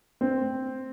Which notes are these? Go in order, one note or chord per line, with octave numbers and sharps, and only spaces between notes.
C4